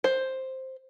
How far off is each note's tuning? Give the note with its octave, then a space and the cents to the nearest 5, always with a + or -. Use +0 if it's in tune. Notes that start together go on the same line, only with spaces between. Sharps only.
C5 +5